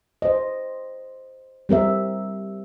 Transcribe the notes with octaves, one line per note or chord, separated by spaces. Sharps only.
C5 D#5
G3 C4 A#4 E5